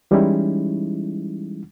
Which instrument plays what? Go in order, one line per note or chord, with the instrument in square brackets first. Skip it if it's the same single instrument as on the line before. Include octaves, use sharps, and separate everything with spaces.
[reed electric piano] E3 G3 G#3 C#4 D#4 E4